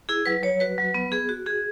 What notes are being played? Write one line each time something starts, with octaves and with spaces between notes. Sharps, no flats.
E4 G#4
F#3 B4
F#3 C#5
F#4 B4
F#3
B3
B3 G#4
F#4
F#4 G#4